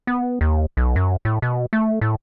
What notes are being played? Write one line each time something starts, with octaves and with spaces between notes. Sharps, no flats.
B3
D#2
B1
F#2
A2
B2
A3
A2